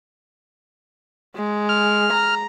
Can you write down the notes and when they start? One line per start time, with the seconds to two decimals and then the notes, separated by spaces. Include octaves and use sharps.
1.36 G#3
1.69 F6
2.13 A#5